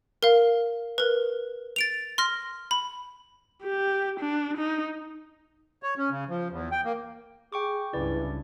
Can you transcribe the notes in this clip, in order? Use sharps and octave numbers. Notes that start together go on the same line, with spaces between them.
A#4 F5
A#4 B4
A6 D7 F7
C6 F6 A#6
B5
G4
D4
D#4
C#5
C#4
C#3
F3
E2
G5
A#3
G#4 G5 C#6 D6
C#2 G2 E3 E4 D5